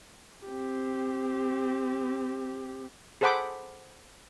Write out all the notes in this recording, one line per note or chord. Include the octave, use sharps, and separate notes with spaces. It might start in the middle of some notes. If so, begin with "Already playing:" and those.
C4 G4
G#4 A4 C5 F#5 B5 D6